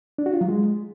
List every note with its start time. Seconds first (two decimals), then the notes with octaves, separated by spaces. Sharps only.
0.18 D4
0.26 F#4
0.34 F4
0.41 F#3
0.49 G#3